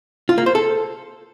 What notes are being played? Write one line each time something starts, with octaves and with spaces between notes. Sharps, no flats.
F4
A#3
C5
A4